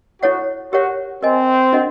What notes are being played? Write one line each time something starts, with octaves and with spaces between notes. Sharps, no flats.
E4 F#4 A4 C#5 F#5
F#4 G4 A#4 C#5 F#5
C4 A#4 D#5 G#5
D4 F#4 A#4 D#5 F#5